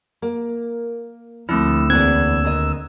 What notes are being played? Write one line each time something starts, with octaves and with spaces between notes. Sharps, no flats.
A#3
D2 F3 A3 C4 E4 E6
E2 G#2 A#3 C4 E4 F#6 G#6
D#2 D#5